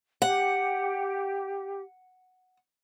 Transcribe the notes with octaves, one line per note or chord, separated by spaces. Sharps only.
G4 F#5